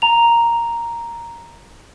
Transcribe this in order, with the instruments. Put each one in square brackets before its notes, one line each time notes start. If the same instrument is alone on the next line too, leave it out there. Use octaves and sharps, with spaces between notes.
[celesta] A#5 F7